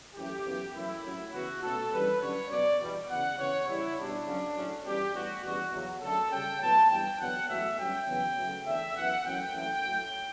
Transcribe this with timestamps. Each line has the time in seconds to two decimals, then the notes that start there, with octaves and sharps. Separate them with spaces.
0.15 F#2 E3 A3 C#4 G4
0.45 F#2 C#3 E3 B3
0.74 F#2 E3 A3 C#4 E4
1.03 A2 F#3 C#4
1.32 C#3 E3 B3 F#4
1.61 B2 A3 C#4 A4
1.91 G2 E3 G3 C#4 B4
2.20 F#2 D3 G3 C#4 C#5
2.50 B2 F#3 B3 D5
2.79 E2 B2 G3
3.08 C#3 E3 B3 F#5
3.37 C#3 E3 B3 C#5
3.67 C#3 E3 G3 E4
3.96 B2 G3 C#4 D4
4.25 F#2 C#3 F#3 C#4
4.55 A2 F#3 A3 C#4
4.84 E2 B2 G3 C#4 G4
5.13 A2 E3 G3 B3 F#4
5.43 E2 B2 G3 C#4 F#4
5.72 E2 C#3 F#3
6.01 F#2 D3 A3 A4
6.30 C#3 G3 C#4 G5
6.60 A2 F#3 B3 A5
6.89 G2 E3 B3 G5
7.18 E2 D3 F#3 B3 F#5
7.48 E2 B2 F#3 A3 C#4 E5
7.77 G2 F#3 C#4 G5
8.06 E2 C#3 F#3 B3
8.37 C#3 F#3 A3
8.65 E2 D3 A3 E5
8.95 F#2 E3 B3 F#5
9.24 F#2 E3 A3 C#4 G5
9.53 F#2 E3 A3 C#4 G5
9.83 A2 F#3 A3